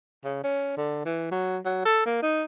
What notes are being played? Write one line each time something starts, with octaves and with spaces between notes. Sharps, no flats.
C#3
C#4
D3
E3
F#3
F#3
A4
A#3
D#4